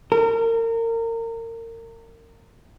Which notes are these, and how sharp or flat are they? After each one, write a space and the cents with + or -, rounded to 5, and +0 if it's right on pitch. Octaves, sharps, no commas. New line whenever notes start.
A#4 -30